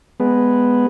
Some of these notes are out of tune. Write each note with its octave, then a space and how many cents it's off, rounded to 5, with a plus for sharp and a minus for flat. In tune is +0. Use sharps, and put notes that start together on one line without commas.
G#3 +0 B3 +0